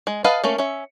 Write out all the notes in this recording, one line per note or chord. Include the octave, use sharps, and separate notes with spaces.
G#3
B4 D#5 F5 F#5 A5
A3 A#3 C#4
C#4 E5